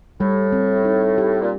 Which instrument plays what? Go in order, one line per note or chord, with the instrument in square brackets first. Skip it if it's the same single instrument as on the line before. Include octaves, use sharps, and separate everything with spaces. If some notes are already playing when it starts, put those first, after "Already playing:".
[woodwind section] A2 [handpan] G3
[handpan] C4
D#4
G4
[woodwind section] A#2